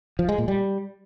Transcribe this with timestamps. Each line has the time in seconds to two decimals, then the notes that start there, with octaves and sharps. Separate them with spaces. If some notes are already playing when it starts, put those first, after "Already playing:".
0.19 F3
0.29 G#3
0.38 A#2
0.48 G3